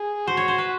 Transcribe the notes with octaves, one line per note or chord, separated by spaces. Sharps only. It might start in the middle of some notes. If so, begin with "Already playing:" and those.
Already playing: G#4
F#4 C5
C#5
C5
B4